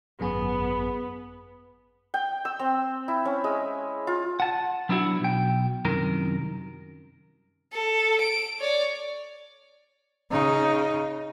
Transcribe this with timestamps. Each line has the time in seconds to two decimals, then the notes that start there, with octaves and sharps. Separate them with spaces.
0.20 G#1 F#2 B3 G#4
2.14 G5
2.45 E6
2.59 C4
3.08 E4
3.25 C#4
3.44 G#3
4.07 F4
4.40 F#5 A5
4.89 F#3 B3 D4 E4 F#4
5.21 B1 G5
5.85 C2 F#2 D#3 A#4
7.73 A4
8.20 D7
8.60 C#5 D5
10.31 C#3 D#4